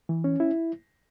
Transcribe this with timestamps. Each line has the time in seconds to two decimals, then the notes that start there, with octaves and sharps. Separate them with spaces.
0.09 E3
0.24 C#4
0.40 E4